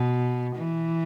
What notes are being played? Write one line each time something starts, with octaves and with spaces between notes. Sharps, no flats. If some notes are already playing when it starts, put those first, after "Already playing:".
Already playing: B2
E3